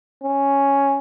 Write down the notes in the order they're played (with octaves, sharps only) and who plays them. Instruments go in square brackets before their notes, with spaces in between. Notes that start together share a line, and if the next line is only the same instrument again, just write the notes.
[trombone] C#4